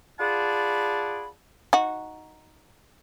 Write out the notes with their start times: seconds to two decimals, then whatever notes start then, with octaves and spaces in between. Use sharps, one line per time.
0.20 F4 G#4 D5 F#5 A5 B5
1.73 D#4 F#4